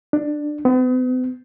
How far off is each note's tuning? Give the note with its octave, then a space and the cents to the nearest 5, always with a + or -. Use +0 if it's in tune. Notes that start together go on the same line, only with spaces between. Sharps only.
D4 +15
B3 +45